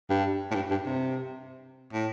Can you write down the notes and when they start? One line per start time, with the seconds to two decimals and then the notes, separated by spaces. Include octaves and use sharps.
0.10 G2
0.51 A2
0.55 G2
0.71 G2
0.86 C3
1.93 A2